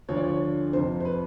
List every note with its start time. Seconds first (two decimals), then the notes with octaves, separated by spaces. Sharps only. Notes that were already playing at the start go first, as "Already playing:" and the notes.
0.09 D2 D3 F3 C#5
0.16 D5
0.24 C#5
0.73 F2 C3 F3 C5
1.00 C5
1.05 B4